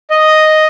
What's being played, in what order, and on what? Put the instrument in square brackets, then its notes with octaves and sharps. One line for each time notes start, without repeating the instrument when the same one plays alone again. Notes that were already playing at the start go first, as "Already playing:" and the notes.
[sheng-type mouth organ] D#5